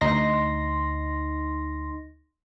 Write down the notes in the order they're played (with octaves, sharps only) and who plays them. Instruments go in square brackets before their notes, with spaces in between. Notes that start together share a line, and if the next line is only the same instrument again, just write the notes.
[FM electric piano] D2 D#4 C6 A#6